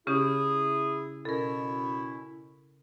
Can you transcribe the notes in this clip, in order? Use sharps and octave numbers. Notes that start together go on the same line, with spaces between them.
C#3 C#4 E4 G4 G#4
B2 C#4 E4 A4 A#4